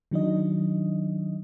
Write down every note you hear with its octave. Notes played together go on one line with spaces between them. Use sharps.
D#3 F#3 D4 D#4 D#5